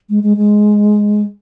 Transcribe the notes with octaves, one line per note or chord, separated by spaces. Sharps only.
G#3
G#3
G#3